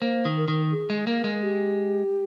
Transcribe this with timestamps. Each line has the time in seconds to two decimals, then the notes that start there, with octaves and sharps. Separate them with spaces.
0.01 A#3 C5
0.25 D#3
0.37 A#4
0.48 D#3
0.72 G#4
0.90 G#3
1.06 A#3 A#4
1.24 G#3
1.42 G4